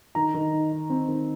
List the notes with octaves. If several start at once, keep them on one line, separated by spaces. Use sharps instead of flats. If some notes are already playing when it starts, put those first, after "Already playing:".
D#3 A#5
D#3
D#4
D#4
C4
D#3